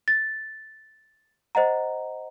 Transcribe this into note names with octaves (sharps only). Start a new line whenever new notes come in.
A6
C5 D#5 F#5 A#5